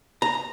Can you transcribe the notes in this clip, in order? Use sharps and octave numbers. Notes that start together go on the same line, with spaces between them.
A#5